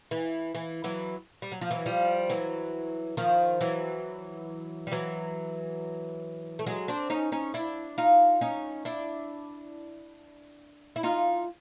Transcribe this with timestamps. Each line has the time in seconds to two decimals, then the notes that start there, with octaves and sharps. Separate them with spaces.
0.11 E3
0.55 E3
0.84 E3 F#3
1.42 G3
1.52 F#3
1.61 F3
1.71 E3 F#3
1.86 F3 G3
2.30 E3 F#3
3.17 D#3 F3
3.61 E3 F#3
4.87 G3
4.92 E3 F#3
6.59 A3
6.66 F#3 G#3
6.88 C4 D4
7.10 C#4 D#4
7.32 C#4 D#4
7.54 D4 E4
7.98 D#4 F4
8.41 C#4 D#4
8.85 D4 E4
10.96 E4
11.03 D#4 F4